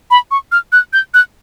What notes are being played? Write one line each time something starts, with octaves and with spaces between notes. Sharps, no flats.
B5
C#6
F6
F#6
G6
F#6